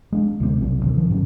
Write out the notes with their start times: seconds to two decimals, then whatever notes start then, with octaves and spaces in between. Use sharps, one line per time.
0.12 G#3 D4
0.40 D2 C3 G#3 C4
0.61 B1 C3 F#3 C4
0.84 D2 C3 D#3
0.98 D#3 F3
1.10 G2 C3 F#3 C#4